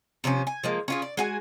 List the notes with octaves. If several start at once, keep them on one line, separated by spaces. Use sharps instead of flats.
C3 F3 C4 C#4
G#5
F3 G#3 A#3
C#4 F4 G#4
D5
G#3 F#4 G#5